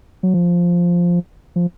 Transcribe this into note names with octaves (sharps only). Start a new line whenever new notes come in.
F#3
F3
F3